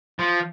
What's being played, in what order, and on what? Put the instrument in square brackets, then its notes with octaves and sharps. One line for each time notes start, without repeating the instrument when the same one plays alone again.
[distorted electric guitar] F3